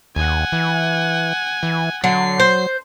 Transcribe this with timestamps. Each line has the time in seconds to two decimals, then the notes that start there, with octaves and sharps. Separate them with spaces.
0.16 D#2 F#5 G#5
0.52 E3
1.63 E3
2.04 D3 F#3 C7
2.40 C5